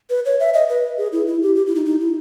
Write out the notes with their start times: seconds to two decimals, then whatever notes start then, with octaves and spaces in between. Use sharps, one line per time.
0.10 B4
0.25 C#5
0.40 E5
0.54 D#5
0.69 B4
0.98 G#4
1.12 E4
1.27 E4
1.42 G4
1.56 G4
1.66 E4
1.76 D#4
1.86 D#4
2.00 E4